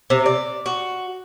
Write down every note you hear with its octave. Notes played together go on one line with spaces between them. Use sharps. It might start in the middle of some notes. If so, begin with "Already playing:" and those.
C3
D5
F#4